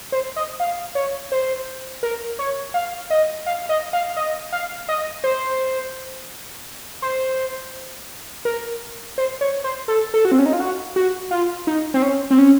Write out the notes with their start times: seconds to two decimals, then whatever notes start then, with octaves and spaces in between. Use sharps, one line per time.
0.12 C5
0.36 D#5
0.60 F5
0.95 C#5
1.32 C5
2.03 A#4
2.39 C#5
2.74 F5
3.10 D#5
3.46 F5
3.69 D#5
3.93 F5
4.17 D#5
4.52 F5
4.89 D#5
5.24 C5
7.02 C5
8.45 A#4
9.18 C5
9.41 C#5
9.64 C5
9.88 A4
10.14 A4
10.25 F#4
10.32 C4
10.39 C#4
10.46 D#4
10.53 F4
10.60 F#4
10.96 F#4
11.31 F4
11.67 D#4
11.94 C4
12.02 C#4
12.31 C4
12.38 C#4